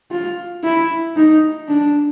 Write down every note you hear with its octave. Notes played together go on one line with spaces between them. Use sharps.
F4
E4
D#4
D4